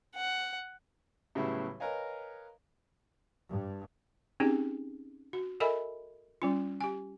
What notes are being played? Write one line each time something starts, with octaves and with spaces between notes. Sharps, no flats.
F#5
A2 C#3 F#3 G3 B3 E4
A#4 B4 C#5 D#5 F5 G#5
G2
C4 C#4 D#4 G4 G#4
F#4
A4 A#4 D#5 E5 G#5 B5
G3 C#4 F4
G4 G#5